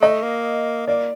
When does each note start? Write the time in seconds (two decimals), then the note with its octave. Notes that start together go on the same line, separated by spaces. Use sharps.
0.02 A3 D#5
0.23 A#3
0.87 A#3 D5